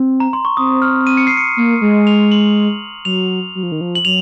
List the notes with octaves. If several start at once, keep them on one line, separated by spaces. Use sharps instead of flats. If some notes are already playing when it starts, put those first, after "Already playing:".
Already playing: C4
A#5
C6
C#6
C4 D#6
F6
D#7
C#7
C7
C#7
A#3
G#3
F7
F#7
F#3 F7
F#3
F3
D#3
F3
F#7
F#3 F7